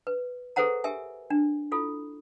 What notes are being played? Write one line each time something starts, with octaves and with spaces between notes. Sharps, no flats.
B4
G#4 A4 B4 C5 F#5 A#5
G4 A#4 E5 G#5
D4
E4 F4 A4